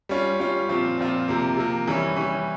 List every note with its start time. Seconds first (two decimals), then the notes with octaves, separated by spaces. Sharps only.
0.09 G3 C#4 F4
0.40 G3 C#4 F4
0.69 A#2 F3 C4 F4
0.98 A#2 F3 C4 F4
1.28 C3 F3 A#3
1.57 C3 F3 A#3
1.87 E3 G3 C#4
2.16 E3 G3 C#4